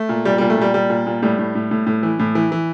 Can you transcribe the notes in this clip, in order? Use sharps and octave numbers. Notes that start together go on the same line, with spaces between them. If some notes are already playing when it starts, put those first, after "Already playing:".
Already playing: A3
A#2
A#2 G3
A#2 G3
A3
A#2 G3
A#2 G3
A#2
A#2
A2 G3
A2
A2
A2
A2
E3
A2
E3
E3